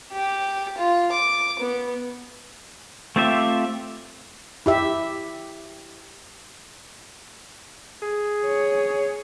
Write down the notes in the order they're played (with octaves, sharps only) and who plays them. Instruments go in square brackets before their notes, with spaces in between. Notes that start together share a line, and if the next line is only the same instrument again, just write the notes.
[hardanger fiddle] G4
F4
D6
B3
[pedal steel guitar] A3 C4 F4 G4 E5
[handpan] E4 G4 E5
[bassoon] G#4
[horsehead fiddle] C#5